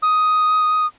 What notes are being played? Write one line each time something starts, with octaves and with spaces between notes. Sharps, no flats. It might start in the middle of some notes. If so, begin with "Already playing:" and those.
D#6